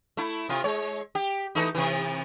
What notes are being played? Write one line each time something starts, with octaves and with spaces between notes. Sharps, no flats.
A3 E4
C3 F4
G#3 C#5
G4
E3 A3 D#4
C3 E3